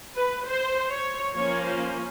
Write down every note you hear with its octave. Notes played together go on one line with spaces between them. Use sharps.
B4
C5
C#5
F3 A#3 C#4 C#5
C5